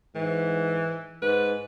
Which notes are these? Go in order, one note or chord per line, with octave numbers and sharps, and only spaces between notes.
G#2 E3
G#2 B4